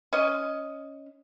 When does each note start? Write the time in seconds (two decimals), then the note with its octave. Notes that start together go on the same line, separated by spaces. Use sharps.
0.13 C#4 D#5